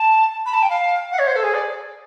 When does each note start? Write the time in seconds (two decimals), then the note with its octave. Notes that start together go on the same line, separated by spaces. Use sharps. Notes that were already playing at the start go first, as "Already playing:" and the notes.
Already playing: A5
0.45 B5
0.53 A5
0.62 G5
0.69 F5
1.11 F#5
1.18 C#5
1.26 C5
1.35 A4
1.43 G#4
1.54 D5